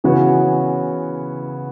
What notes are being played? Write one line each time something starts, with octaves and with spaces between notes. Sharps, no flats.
C#3 E3 B3 F#4 C#5